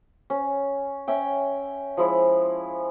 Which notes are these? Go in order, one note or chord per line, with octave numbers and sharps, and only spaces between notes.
C#4
C#4 E5 G5
F3 G#3 E4